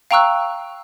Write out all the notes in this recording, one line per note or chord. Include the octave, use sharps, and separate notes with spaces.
F5 G5 A#5 C#6 E6 F#6